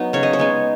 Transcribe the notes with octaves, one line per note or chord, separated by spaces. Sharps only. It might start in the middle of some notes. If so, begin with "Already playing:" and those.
Already playing: F#3 B3 D#4
C#3 C#5
D#5
C#5
G#3 B3 D#4